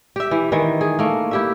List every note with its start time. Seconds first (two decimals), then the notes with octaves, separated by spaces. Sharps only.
0.16 G4 E5
0.31 E3
0.52 D#3 E3
0.81 G#4
0.99 A3 A#3
1.31 E4 G4 E5